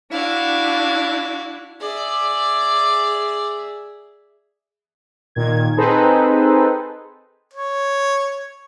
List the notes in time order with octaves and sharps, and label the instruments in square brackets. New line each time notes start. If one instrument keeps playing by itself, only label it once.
[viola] D4 E4 [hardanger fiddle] F#4 F5
[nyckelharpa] G#4 E5 [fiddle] D5
[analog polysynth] A#2 D#3 G#6
C4 D#4 G#4 A4 B4 C5
[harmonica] C#5